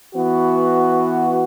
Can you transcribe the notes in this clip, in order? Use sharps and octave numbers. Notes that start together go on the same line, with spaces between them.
E3 B3 F#4